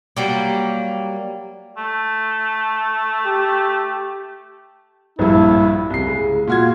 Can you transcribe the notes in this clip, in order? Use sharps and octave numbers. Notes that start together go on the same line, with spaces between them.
F#3 G3 A#3
A3
G4
A#1 G2 E4
C2 C#3 C7
G#3
A#2 F4 F#4 G#6